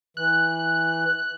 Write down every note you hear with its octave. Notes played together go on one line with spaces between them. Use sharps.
E3 F#6